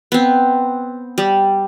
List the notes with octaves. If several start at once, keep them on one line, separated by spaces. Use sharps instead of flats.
B3 C4
G3